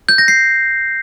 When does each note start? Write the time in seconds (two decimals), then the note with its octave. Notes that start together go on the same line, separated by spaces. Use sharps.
0.09 G6
0.18 A#6
0.28 C7